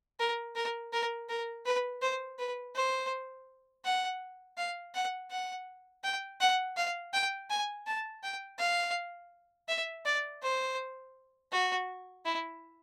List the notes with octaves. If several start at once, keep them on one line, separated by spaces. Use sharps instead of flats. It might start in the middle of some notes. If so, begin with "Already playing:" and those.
A#4
A#4
A#4
A#4
B4
C5
B4
C5
F#5
F5
F#5
F#5
G5
F#5
F5
G5
G#5
A5
G5
F5
E5
D5
C5
F#4
E4